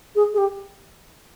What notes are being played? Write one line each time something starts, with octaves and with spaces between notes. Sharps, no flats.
G#4
G#4
G4